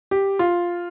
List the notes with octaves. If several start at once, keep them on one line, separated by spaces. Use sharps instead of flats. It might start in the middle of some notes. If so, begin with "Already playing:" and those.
G4
F4